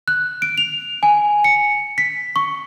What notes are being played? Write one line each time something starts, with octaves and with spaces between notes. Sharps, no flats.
F#6
D7
F7
G#5
C#7
B6
C#6